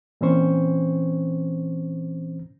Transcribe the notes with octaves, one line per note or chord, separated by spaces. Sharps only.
A#2 E3 C4 C#4 C5 C#6